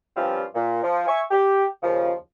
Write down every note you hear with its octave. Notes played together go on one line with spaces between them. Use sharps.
G2 F3 G3 C4 C#4 F4
A#2
F3
E5 G#5 C#6
G4
D#2 C#3 F3